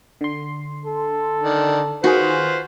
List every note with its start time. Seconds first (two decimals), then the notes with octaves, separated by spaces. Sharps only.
0.21 D3 C6
0.86 A4
1.43 D#3 D4
2.04 D#3 F4 F#4 G#4 B4 C5